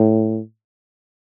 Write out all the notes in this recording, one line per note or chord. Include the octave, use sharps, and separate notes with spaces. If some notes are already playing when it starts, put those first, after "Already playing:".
Already playing: A2